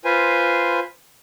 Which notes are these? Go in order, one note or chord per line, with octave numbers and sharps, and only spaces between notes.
F4 B4 C5 G#5